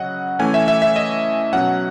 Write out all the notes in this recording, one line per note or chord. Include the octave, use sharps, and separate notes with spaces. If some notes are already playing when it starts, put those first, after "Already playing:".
Already playing: C#3 F#3 C#4 D#5 F#5
E3 A3 C#4 G#5
E5
E5
E5
D#5
B2 F#3 C#4 F#5